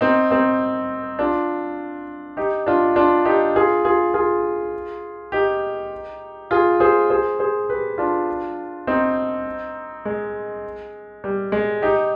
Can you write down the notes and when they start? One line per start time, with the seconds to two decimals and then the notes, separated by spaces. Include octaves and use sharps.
0.01 C4 D#4
0.30 C4 D#4
1.19 D4 F4
2.37 D#4 G4
2.66 D4 F4
2.96 D4 F4
3.25 D#4 G4
3.56 F4 G#4
3.85 F4 G#4
4.14 F4 G#4
5.32 D#4 G4
6.51 F4 G#4
6.80 G#4 C5
7.10 G#4 C5
7.39 G#4 C5
7.70 G4 B4
7.98 D4 F4
8.87 C4 D#4
10.05 G#3
11.24 G3
11.52 G#3
11.82 D#4 G4